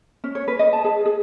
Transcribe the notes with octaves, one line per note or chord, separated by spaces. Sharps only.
C#4
C#5
B4
D#5
A5
G#4
G#4